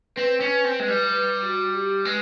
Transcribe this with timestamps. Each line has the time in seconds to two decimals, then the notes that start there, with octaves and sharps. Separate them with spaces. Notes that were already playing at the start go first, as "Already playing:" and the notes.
0.16 C4 B4
0.41 C#4
0.65 C4
0.80 G#3
0.88 G3
1.11 B4
1.43 F#4
1.74 G4
2.05 G#3 B4